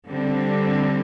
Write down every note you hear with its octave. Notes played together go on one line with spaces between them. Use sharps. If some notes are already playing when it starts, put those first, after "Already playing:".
D3 G3 C4